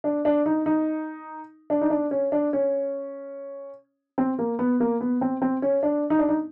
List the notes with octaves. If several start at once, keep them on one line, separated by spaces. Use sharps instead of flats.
D4
D4
D#4
D#4
D4
D#4
D4
C#4
D4
C#4
C4
A#3
B3
A#3
B3
C4
C4
C#4
D4
D#4
D4
D#4